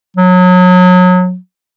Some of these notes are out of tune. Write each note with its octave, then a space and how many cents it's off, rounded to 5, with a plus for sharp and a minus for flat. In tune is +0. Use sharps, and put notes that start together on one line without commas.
F#3 -30